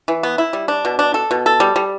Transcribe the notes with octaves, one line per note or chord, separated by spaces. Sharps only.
E3
B3
E4
G3
D4
B2
D4
A4
B2
A4
G3
G3